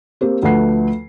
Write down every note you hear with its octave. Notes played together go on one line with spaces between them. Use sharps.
A#3 C4 G4
D2 F3 A3 B4 F#5 C7